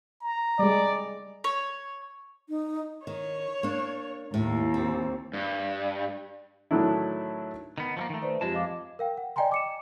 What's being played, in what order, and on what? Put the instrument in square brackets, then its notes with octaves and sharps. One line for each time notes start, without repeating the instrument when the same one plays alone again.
[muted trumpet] A#5
[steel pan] G3 G#3 [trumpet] D5
[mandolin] C#5
[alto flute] D#4
[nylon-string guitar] D#3 [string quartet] C#5
[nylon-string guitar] A#3 D4
[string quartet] D#2 [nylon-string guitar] A2
[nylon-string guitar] C4
[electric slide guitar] G2
[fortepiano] A2 D#3 F#3 A3 D4 E4
[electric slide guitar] D#3 B3
F3 A3 A#3
D#3 A3
[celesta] B4 C5 D5
[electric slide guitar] F2 G#3 A5 [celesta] F4 G4
[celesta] D#5 F5 D6
A#4 F5 G5
F#5
D5 D#5 G5 G#5 A#5 C6
D6 C#7 E7